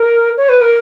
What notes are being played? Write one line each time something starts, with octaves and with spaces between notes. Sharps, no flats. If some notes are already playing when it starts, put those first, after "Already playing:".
Already playing: A#4
C#5
B4
A#4